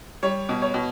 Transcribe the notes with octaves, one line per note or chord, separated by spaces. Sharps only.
G3 C#5
B2
C#5
B2